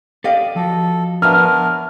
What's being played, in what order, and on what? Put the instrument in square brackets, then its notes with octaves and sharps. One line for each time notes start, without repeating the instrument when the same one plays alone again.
[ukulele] G4 D#5 F5 [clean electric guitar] A4 D5
[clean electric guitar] F3 F#4 [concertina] A4
[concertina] B3 D4 A#4 [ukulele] B4 C#5 E5 [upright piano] F6